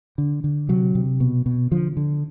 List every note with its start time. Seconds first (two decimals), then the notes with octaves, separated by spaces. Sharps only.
0.18 D3
0.44 D3
0.69 C3 F#3
0.95 C3
1.20 B2
1.46 B2
1.71 D3 F3
1.97 D3